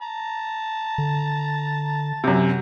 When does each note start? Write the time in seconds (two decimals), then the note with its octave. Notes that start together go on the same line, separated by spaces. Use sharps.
0.02 A5 A#5
0.98 D3
2.24 F#2 C3